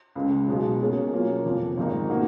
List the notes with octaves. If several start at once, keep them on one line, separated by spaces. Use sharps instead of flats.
C#2 C#3 G#3
B1 B2 G#3
B2 A#3 C#4 G#4
B2 F#3 A#3 C#4 F4
F1 F2 F3
G#1 G#2 F3 A#3 D#4
B2 A#3 D#4 F#4